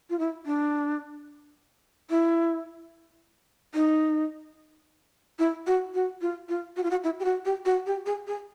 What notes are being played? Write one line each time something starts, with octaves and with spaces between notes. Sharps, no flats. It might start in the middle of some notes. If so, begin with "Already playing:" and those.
F4
E4
D4
E4
D#4
E4
F#4
F#4
F4
F4
F#4
F4
F#4
E4
G4
F#4
G4
F#4
G4
G#4
G#4